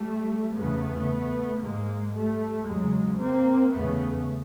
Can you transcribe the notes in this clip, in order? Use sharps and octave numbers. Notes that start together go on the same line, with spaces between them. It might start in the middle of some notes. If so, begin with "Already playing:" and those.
Already playing: G3 A3
E2 C#3 A3 B3
G#2 G#3 A#3
G3 A3
E2 C#3 F#3 G#3
A#3 C4
E2 C#3 A3 B3